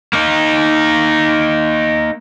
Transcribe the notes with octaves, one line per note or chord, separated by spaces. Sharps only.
A#3 D#4